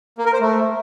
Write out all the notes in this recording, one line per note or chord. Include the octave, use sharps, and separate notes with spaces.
A#3
A#4
C5
A3